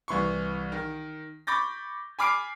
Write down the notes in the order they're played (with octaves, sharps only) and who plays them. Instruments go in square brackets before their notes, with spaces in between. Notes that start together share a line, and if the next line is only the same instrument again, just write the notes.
[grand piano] C2 E3 C6 C#6
D#3
B5 C#6 D6 G6 A6 A#6
G#5 B5 D6 F6 C7 D7